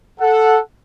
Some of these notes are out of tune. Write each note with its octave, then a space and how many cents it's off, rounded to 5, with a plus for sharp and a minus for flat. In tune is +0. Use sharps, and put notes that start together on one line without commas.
A4 +0 F#5 -10